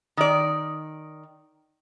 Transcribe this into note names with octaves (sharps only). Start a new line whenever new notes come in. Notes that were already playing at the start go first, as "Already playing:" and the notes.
D#3 D5